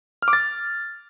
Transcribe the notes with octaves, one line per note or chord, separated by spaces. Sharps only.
F6
D6
A6